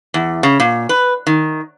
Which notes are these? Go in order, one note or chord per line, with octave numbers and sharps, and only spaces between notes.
E2
C#3
A#2
B4
D#3